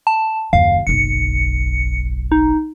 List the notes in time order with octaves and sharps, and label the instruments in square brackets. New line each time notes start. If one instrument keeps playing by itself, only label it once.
[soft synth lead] A5
[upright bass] F#1 D#2 [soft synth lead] F5
[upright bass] F#1 B1 [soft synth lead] C#7
[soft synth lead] D#4